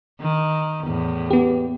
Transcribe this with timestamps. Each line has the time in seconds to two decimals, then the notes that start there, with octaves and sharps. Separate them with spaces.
0.20 D#3
0.84 E2 A2
1.31 B3 G4